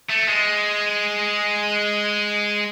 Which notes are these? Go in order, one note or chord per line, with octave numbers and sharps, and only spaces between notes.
A3
G#3